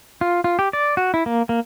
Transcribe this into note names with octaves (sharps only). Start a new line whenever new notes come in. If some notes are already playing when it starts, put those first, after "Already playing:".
F4
F4
G4
D5
F#4
E4
A#3
A#3